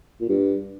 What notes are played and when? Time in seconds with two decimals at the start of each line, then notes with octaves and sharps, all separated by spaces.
0.21 A#2
0.29 G2